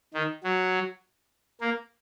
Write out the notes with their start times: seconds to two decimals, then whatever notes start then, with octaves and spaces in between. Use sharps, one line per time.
0.14 D#3
0.44 F#3
1.61 A#3